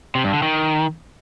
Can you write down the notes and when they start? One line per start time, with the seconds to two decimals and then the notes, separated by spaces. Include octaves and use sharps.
0.15 C3
0.24 G2
0.33 D3
0.42 D#3